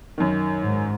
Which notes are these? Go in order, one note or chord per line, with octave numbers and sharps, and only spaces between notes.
F#2 D#3
G#2